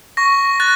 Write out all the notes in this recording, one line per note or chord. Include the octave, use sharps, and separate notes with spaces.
C#6 A#6
F#6 A6